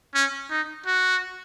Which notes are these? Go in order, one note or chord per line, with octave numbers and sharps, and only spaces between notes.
C#4
D#4
F#4